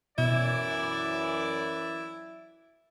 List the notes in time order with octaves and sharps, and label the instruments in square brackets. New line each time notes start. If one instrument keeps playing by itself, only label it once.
[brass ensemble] F#2 E3 D5 [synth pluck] B2 [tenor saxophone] E4